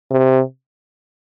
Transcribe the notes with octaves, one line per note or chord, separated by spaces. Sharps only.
C3